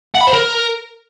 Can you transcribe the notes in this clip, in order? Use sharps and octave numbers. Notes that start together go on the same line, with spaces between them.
F#5
B5
C5
A#4